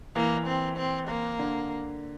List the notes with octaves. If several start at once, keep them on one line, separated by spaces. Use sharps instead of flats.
E3 A#3
C4
C4
A#3
D3